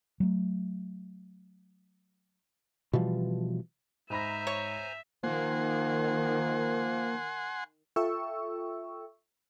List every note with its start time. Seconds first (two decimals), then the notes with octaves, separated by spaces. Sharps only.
0.20 F#3 A3
2.93 B2 E3 F3 G3
4.10 G#2 C5 E5 G#5 A#5 B5 A#6
4.47 C#5
5.24 D#3 F3 A#3 F#5 G#5 C6
7.96 F4 A4 E5 G5 C#6 E6